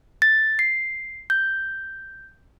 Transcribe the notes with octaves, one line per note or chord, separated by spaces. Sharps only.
A6
C7
G6